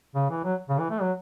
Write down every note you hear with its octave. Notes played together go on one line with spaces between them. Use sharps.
C#3
E3
F#3
C#3
E3
A3
F#3